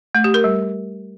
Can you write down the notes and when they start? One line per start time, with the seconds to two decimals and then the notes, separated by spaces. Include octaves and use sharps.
0.15 A3
0.24 G4
0.34 A#4
0.44 G3